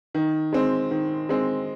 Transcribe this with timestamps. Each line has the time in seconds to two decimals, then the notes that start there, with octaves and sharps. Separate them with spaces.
0.15 D#3
0.53 G#3 C4
0.91 D#3
1.29 G#3 C4